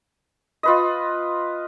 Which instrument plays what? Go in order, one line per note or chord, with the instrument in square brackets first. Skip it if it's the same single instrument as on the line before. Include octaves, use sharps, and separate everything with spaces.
[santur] F4 B4 D#5